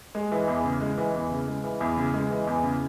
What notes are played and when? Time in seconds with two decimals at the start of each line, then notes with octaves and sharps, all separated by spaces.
0.15 G#3
0.32 E3
0.48 E2
0.64 C#3
0.81 G#3
0.98 E3
1.15 E2
1.31 C#3
1.48 G#3
1.64 E3
1.81 E2
1.97 C#3
2.14 G#3
2.31 E3
2.47 E2
2.63 C#3